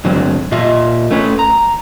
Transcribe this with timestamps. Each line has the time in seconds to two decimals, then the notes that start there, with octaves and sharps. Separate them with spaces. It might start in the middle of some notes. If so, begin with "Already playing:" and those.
0.05 G2 D3 F#3 G#3 C4
0.52 A#2 F4 D#5 E5
1.11 A3 C#4 B4
1.39 A#5